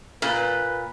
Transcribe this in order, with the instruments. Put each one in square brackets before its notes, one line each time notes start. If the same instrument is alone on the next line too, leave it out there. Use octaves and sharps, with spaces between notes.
[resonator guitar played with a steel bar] A#2 [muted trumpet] B4